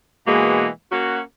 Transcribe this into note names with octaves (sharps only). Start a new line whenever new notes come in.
B2 E3 G#3 A#3 F#4
A#3 C#4 F#4